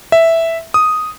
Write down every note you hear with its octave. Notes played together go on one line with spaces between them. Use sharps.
E5
D#6